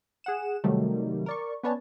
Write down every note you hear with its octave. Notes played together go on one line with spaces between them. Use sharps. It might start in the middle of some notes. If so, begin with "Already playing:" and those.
G#4 F#5 E7
C3 D#3 F#3 G3 A3
A#4 D5 C#6
B3 C#4 B4 C#5 D5 A5